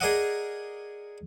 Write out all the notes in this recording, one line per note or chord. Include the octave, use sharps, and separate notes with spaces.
G#4 A#4 D5 D#5 F#5